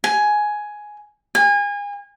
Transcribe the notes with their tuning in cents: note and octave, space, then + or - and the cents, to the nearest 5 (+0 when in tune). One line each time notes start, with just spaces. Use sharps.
G#5 +10
G#5 -30